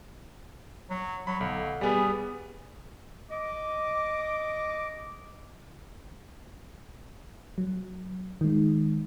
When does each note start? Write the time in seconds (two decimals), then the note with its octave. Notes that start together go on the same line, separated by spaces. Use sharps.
0.90 F#3
1.27 F#3 B5
1.41 B1 D3
1.81 G3 B3 G#4
3.31 D#5 D6
7.58 F#3
8.41 D#3 G#3